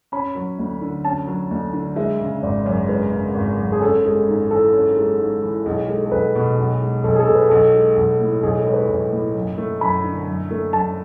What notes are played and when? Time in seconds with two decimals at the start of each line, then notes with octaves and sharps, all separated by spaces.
0.12 C#4 B5
0.35 F#3
0.59 D2
0.81 D3
1.05 C#4 A5
1.27 F#3
1.51 D2
1.73 D3
1.96 G#3 E5
2.20 C#3
2.43 G#1 D5
2.66 F#2 C#5
2.88 G#3 B4
3.13 C#3
3.35 G#1
3.58 F#2
3.72 G#4
3.81 C#4 A4
4.04 G#3 G#4
4.27 G#2
4.51 E3 A4
4.73 C#4
4.96 G#3
5.20 G#2
5.43 E3
5.66 B1 G#4
5.88 G#3 A4
6.06 A4
6.12 B1 B4
6.35 B2
6.58 B1
6.81 G#3
7.04 B1 A4
7.15 G#4
7.20 A4
7.27 B2
7.35 B4
7.50 B1 A4
7.74 G#3
7.97 B1
8.20 A2
8.43 B1 G#4
8.58 A4
8.65 G#3 C#5
8.73 B4
8.89 B1 C#5
9.12 A2
9.35 F#2
9.58 A3
9.80 F#2 B5
10.04 D3
10.27 F#2
10.51 A3
10.73 F#2 A5